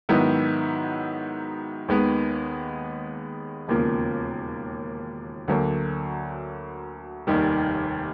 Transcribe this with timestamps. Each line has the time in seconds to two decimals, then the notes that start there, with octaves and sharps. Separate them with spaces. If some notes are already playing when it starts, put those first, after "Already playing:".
0.09 G#2 D#3 F#3 B3 E4
1.88 D#2 D#3 G#3 B3
3.68 E1 D#2 C#3 F3 A#3
5.48 D2 D3 F#3 A#3
7.27 F1 D#2 D#3 G3